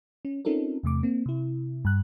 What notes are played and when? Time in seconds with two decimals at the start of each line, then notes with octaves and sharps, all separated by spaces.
0.25 C#4
0.45 C4 C#4 D#4 F4 A4 A#4
0.83 E2 C3 A3 D6
1.03 A#3 C4
1.26 C3 E4
1.85 G2 F#6